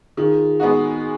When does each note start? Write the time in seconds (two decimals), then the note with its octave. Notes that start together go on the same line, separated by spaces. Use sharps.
0.17 D#3 F4 G#4
0.60 G#3 B3 D#4 F#4